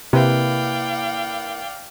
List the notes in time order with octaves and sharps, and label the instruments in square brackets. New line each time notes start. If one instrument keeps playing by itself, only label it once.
[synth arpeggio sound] C3 [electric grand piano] A#3 E4 B4 [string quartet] D5 F5 G5